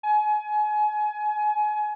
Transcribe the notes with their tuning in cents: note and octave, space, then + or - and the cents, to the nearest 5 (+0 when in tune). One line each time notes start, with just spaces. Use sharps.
G#5 +30